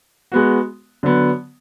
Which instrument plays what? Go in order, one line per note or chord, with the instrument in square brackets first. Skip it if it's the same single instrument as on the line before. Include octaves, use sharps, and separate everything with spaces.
[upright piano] G#3 B3 F#4
D3 F#3 B3